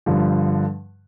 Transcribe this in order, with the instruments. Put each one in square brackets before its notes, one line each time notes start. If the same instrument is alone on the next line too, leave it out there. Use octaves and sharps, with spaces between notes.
[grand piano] G2 D3 F3